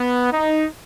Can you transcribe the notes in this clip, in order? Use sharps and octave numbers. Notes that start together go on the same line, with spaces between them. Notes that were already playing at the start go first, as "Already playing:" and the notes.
Already playing: B3
D#4